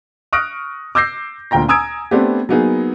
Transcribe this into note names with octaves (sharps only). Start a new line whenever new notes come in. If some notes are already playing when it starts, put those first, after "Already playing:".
C#6 D#6 F6 F#6 A#6 D7
D6 E6 G6 A#6 C7
D2 A#2 G5 A#5 A#6
G#5 A#5 D#6 E6 G#6 D7
A3 B3 C4 D4 G4
F#3 A#3 B3 D#4 G#4